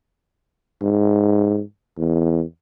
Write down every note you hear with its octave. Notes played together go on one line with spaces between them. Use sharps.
G#2
E2